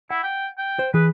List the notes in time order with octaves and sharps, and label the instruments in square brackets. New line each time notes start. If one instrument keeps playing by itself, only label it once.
[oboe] E4 [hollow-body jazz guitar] F#5
[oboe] G5
G5
[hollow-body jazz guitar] C5
[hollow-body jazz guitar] E3 G#4 [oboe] B4